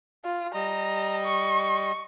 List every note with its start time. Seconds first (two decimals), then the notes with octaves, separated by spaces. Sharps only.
0.25 F4
0.54 G3 D#5 A#5
1.24 C#6